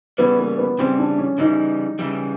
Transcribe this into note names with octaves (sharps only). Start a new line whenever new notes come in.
C#3 E3 G3 B3
A#3
B3
C#3 E3 G3 C4
D4
C#4
C#3 E3 G3 D#4
C#3 E3 G3